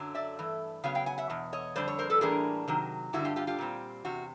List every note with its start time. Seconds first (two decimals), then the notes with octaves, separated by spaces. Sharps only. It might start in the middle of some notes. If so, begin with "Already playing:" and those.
Already playing: F#2 D3 F#3
0.15 D5 E5
0.38 G2 E3 A3
0.84 C#3 F#3 B3 F5
0.95 F5 G5
1.06 F#5 G#5
1.18 E5 F#5
1.30 E2 B2
1.53 C#5 D#5
1.76 F2 D3 G3 C5 D5
1.88 C#5
1.99 A#4 C5
2.10 A4 B4
2.21 A2 E3 G3 A#3 D4 G#4 A#4
2.68 C3 D#3 F#3
3.13 G2 D3 G3 E4 F#4
3.25 F4 G4
3.36 F4 G4
3.47 F4 G4
3.59 A#2 G3 C4
4.05 E2 C3 F#4